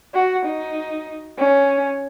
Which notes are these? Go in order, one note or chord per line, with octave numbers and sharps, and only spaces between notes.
F#4
D#4
C#4